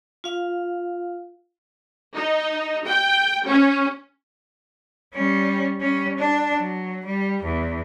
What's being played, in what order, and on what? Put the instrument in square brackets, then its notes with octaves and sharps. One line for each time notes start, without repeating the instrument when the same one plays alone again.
[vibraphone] F4 F5
[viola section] D#4
G5
C#4
[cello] G3 C#4
G3 C#4
D4
F#3
G3
E2